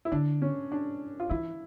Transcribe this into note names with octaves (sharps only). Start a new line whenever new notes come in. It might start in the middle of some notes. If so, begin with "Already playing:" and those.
E4
D3 D4
C#4
D4
F4
E3 E4